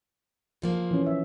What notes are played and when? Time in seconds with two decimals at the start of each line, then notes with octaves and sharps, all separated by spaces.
0.62 C#3 F3 A#3
0.91 E3 C#4
1.06 F3 E5